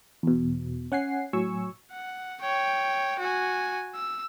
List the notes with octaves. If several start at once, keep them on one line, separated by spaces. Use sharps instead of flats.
E2 B2
C#4 F#5 G#5 C7
A2 F#3 G#5 C#6 E6
F#5
C#5 G5
F#4 G#5
E6